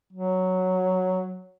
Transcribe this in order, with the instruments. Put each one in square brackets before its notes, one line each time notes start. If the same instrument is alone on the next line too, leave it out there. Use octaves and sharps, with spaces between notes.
[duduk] F#3